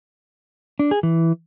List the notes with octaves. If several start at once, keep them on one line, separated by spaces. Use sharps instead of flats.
D4
G#4
E3